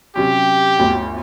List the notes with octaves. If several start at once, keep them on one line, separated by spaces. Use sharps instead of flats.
C3 F#3 C#4 G4
G1 D2 G5